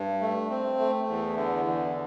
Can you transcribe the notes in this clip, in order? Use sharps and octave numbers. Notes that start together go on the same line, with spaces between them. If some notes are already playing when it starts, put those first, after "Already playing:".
Already playing: G2
A3
C4
A3
E2
D3
E2